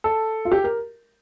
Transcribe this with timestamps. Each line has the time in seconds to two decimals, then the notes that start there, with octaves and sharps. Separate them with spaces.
0.04 A4
0.45 F4
0.52 G4
0.64 A#4